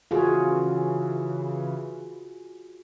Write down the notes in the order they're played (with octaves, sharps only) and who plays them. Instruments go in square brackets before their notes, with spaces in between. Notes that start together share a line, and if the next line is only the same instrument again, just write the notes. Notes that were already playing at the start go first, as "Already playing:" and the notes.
[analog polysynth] C#3 E3 [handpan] F4 F#4 G#4